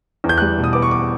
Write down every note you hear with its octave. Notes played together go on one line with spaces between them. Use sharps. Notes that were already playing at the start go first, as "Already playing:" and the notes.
E2
G6
G3 F#6
B2
D#6
B3 D6
C#6
D6